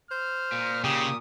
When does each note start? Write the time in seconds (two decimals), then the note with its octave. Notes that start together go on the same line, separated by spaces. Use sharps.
0.11 C5 F6
0.52 A#2
0.84 C#3 G4 D#6